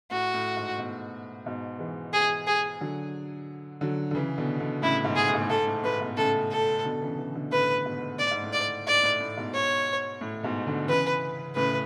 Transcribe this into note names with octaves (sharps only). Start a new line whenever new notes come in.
A2 F#4
A2
G#2
G#2 B2
G#2 B2
E3 G#3
G#4
G#4
D3 F#3
D3 F#3
D3
C#3 E3
B2 D3
B2 D3
A2 C#3 E4
G#2 B2
G#4
A2
G#2
A2
G#2 A4
A2
A2 B4
G#2 B2
A2 C#3 A4
A4
B2 D3
C#3 E3
C#3 E3
B2 D3
A2 C#3 B4
G#2 B2
A2 D5
G#2
A2
D5
G#2 D5
A2
A2
G#2 B2
C#5
A2
G#2 B2
B2 D3
C#3 E3 B4
A2 C#3 B4